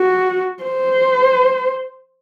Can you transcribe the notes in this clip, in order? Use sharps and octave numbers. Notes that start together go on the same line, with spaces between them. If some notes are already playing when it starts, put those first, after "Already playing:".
Already playing: F#4
C5